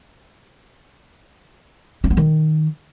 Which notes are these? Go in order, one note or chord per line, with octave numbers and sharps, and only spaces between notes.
C4
B3
D#3